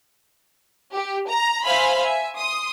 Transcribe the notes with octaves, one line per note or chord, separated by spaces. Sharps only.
G4
A#5
C5 E5 F5 G#5 B5 C6
E5 G#5
C6 D#6